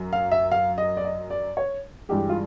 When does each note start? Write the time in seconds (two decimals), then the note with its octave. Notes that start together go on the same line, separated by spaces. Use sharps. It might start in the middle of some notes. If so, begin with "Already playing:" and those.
Already playing: F#2
0.13 F5
0.31 E5
0.52 F5
0.78 D#5
0.97 D5
1.05 D#5
1.30 D5
1.57 C#5
2.09 G2 E3 G#3 G4
2.29 F4